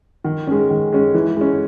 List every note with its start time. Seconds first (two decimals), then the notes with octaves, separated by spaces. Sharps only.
0.24 D#3
0.47 G#3 C#4
0.70 D#3
0.92 G#3 C#4
1.15 E3
1.36 G#3 C#4